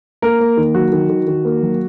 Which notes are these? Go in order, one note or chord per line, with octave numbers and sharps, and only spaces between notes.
A#3 A#4
A#3
D#3
F#3 F#4
D#3
D#3
D#3
A#3
F#3